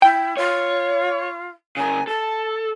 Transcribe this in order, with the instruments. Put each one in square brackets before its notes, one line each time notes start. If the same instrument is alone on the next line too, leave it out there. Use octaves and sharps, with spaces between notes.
[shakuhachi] E4 [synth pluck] G5
[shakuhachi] F4 [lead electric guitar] C#5
[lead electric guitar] C#3 A#4 [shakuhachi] G#5
[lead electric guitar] A4 [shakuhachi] A5